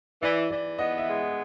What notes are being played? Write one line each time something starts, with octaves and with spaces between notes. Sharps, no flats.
E3 D5
E3 D5
B3 D#5
E5
G#3